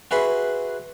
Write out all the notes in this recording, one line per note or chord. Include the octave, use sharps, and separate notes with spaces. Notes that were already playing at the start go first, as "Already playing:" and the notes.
F#4 G#4 B4 E5 B5 C6